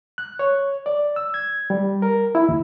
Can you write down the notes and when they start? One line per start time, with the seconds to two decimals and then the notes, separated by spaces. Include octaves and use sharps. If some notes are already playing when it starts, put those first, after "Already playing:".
0.18 F#6
0.39 C#5
0.86 D5
1.16 E6
1.34 G#6
1.70 G3
2.02 A#4
2.35 E4
2.49 D#2